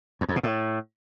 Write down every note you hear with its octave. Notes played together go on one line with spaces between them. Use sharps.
E2
F2
B2
A2